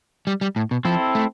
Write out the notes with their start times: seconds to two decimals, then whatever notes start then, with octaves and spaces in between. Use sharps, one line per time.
0.27 G3
0.41 G3
0.56 A2
0.71 B2
0.85 F3 C4 E4 A4
1.15 A3